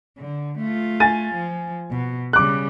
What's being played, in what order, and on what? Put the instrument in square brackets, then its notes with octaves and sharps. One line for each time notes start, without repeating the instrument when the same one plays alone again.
[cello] D3
A3 F4
[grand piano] G#5 A6 D#7
[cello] F3
B2
[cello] C#3 G3 [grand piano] D6 F#6